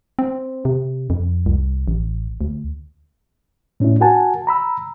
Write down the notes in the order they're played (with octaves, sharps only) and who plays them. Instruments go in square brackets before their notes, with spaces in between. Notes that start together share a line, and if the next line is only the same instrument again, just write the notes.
[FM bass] C4
C3
F2
C2
A1
D2
[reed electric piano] A2 C#4 D4 E4
F#4 A#4 F#5 G#5 A5
A#5 B5 E6